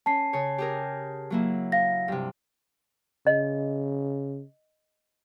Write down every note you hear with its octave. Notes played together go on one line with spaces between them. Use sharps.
C#4 A5 C7
C#3 C#5
G4 G#4 A#4
F#3 A#3 E4
F5 A#6
G2 C3
C#3 D#5